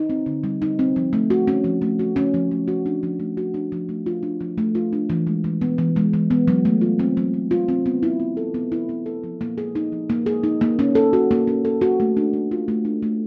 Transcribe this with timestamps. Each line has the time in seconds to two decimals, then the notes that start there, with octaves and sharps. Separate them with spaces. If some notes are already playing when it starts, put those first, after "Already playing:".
Already playing: D#4
0.10 C4
0.26 D3
0.44 G3
0.62 D#4
0.79 C4
0.96 F3
1.13 A3
1.30 F#4
1.47 C#4
1.64 F3
1.82 A3
1.99 F#4
2.16 C#4
2.34 F3
2.51 A3
2.68 F#4
2.86 D4
3.03 F3
3.20 A3
3.37 F#4
3.54 D4
3.72 F3
3.89 A3
4.06 F4
4.23 D4
4.41 F3
4.58 A3
4.75 F4
4.93 D4
5.10 E3
5.27 G#3
5.44 E3
5.61 B3
5.78 E3
5.96 G#3
6.14 E3
6.30 B3
6.48 F#3
6.65 A3
6.81 F4
6.99 C4
7.17 F#3
7.34 A3
7.51 F4
7.68 C4
7.86 B3
8.03 E4
8.20 B3
8.37 A4
8.54 B3
8.72 E4
8.89 B3
9.06 A4
9.24 F3
9.41 A#3
9.58 G#4
9.75 D#4
9.92 F3
10.10 A#3
10.26 G#4
10.43 D#4
10.61 A#3
10.79 C#4
10.95 A4
11.13 F#4
11.31 A#3
11.47 C#4
11.65 A4
11.81 F#4
12.00 A3
12.17 D4
12.33 A3
12.51 F4
12.68 A3
12.85 D4
13.03 A3